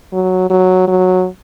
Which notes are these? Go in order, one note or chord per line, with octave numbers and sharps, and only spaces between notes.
F#3
F#3
F#3